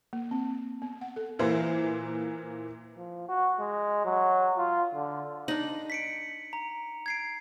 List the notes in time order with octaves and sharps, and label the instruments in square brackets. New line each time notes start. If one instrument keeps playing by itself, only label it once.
[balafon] A#3
C4
B3
F#5
A4
[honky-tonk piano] A#2 E3 A#3 C5
[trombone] F3
F#4
G#3
F#3
F4
D3
[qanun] D4 D#4 [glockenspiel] F#7
[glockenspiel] B6 C#7 D7
A#5
G#6 C7 D7